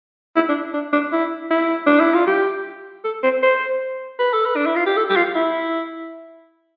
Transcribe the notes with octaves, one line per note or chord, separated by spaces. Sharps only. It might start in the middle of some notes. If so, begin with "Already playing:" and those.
E4
D4
D4
D4
E4
E4
D4
E4
F4
G4
A4
C5
C5
B4
A4
B4
D4
E4
F4
G4
A4
G4
F4
E4